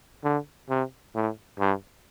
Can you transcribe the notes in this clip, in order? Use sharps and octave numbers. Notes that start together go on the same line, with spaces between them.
D3
C3
A2
G2